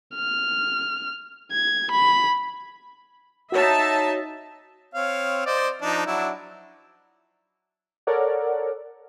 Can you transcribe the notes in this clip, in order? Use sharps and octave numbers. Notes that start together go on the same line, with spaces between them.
F6
G#6
B5
D#4 F#4 C#5 E5 A5
C4 C#5 F5
C5 D5 D#5
F3 D4 D#4
F#3 D4 E4
A4 A#4 C#5 D5 F#5